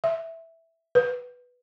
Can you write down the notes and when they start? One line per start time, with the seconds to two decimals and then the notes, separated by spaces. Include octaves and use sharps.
0.04 E5
0.95 B4